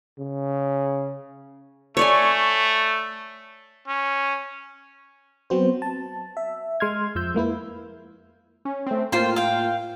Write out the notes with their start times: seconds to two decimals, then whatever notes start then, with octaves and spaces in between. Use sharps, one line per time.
0.19 C#3
1.97 A3 C#5 D5 G#5
3.88 C#4
5.50 F#3 B3 C4 F#4 C5
5.82 A5
6.37 E5
6.80 G#3 C6 F6 G#6
7.15 F2 F3 E6 G6
7.35 G#3 A#3 E4 B4
8.65 C#4
8.87 A3 C4
9.12 A2 A#3 F4 C5 G5 C6
9.36 F5 G5